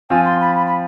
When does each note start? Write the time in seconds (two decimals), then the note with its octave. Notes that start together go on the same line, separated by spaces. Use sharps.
0.10 F3 C4 F4 G#5
0.25 C6
0.40 B5
0.56 B5
0.66 B5